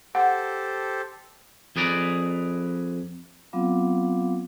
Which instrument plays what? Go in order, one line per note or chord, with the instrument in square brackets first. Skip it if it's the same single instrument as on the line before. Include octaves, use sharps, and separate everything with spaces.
[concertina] G4 A4 C5 [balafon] F#5
[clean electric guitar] F2 G#4 B4 D5 A#5
[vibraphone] F#3 B3 C4 F4 F5 D6